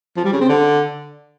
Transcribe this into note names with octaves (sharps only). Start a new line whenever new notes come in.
F3
G3
C#3
C4
D3